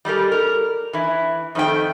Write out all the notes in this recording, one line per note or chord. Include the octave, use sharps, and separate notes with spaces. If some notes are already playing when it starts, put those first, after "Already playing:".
G3 G#3 G4 A#4
A#4
E3 E4
F2 D#3 A3 E4 G5